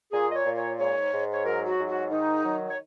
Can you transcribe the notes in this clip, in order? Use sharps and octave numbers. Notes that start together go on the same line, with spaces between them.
A#2 G#4
D#5
C#5
A#2
C#5
G#2 C#5
G#2
C#5
F#3 A#4
F#4
G#2
F#4
D#3 D#4
F#3
C#5